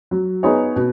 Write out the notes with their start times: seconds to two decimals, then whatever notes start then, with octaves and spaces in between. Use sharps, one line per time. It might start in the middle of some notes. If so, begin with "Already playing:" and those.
0.11 F#3
0.43 B3 D#4 G#4 C#5
0.76 B2